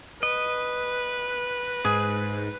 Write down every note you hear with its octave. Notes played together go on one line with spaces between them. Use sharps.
B4 D#5
G#2 G#4